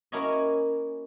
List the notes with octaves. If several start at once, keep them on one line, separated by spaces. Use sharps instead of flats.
A#3 C#4 E4 F#4 C#5 D#5